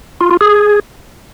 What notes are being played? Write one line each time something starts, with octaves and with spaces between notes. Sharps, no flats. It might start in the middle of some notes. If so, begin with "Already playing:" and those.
F4
F4
G#4